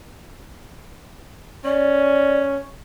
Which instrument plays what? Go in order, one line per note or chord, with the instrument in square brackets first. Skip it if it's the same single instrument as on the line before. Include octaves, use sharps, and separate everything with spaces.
[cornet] C#4 [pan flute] D5